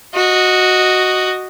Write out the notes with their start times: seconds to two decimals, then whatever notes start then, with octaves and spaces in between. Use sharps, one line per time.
0.15 F#4 D#5